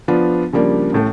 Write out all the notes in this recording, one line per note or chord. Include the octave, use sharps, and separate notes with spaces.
F3 B3 D4 F4
C#3 F3 G3 A#3 D4
A1 A2 A3